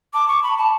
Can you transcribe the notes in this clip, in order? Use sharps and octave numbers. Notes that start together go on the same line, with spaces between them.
A5 D6
C#6
B5
A5